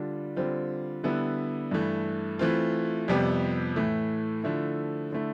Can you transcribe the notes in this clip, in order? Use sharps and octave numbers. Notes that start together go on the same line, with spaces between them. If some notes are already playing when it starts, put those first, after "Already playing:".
Already playing: D3 G3 D4 F4
D3 G3 C4 F4
D3 G3 B3 E4
G2 E3 A3
E3 A3 C4 F4
F2 C3 G3 B3
A2 E3 A3
D3 F3 A3 E4
D3 A3 E4